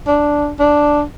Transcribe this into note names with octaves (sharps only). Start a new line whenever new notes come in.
D4
D4